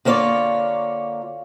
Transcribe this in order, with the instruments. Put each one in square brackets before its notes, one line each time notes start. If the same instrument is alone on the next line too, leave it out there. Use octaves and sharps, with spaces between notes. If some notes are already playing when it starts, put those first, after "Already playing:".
[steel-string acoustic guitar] D3 A#3 F4 C#5 D5